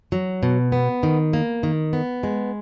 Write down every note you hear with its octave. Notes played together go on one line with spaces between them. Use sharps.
F#3
B2
B3
D#3
A#3
D#3
B3
G#3